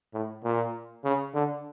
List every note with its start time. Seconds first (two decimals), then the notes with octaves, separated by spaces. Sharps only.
0.14 A2
0.44 A#2
1.04 C#3
1.34 D3